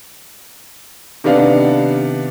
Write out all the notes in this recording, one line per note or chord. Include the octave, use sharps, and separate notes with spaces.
C3 D#3 B3 D4 F5